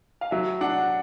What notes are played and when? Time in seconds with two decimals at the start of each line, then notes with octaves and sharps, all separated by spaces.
0.21 F5
0.31 F#3 E5
0.61 D4 F#5